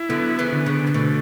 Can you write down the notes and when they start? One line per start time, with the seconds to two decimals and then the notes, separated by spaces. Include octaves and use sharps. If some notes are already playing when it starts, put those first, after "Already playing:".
Already playing: E4
0.09 D3 F#3 B3
0.39 C#3 E3
0.52 D3
0.66 C#3
0.87 C#3
0.94 B2 A3